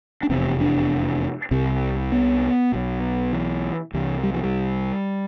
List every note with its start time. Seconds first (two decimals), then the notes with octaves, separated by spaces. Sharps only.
0.23 D4
0.30 F1 E2 C3 C4
0.61 D4
1.51 C2 C3 C4
2.12 B3
2.72 B1 B2
3.33 E3
3.93 C2 C3 E3
4.24 G3
4.34 F3
4.44 G3